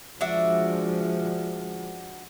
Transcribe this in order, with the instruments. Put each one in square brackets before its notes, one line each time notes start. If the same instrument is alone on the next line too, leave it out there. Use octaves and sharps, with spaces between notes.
[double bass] F3 G#3 [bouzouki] D4 F#4 E5